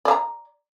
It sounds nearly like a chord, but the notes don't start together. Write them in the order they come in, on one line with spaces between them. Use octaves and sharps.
D5 F5 A#5